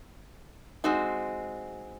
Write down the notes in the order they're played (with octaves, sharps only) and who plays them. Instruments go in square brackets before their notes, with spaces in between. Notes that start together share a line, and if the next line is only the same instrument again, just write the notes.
[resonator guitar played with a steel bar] G#3 C4 D#4 F#4